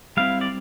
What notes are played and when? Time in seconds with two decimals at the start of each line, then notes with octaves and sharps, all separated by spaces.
0.17 G3 C4 E4 F5
0.41 D5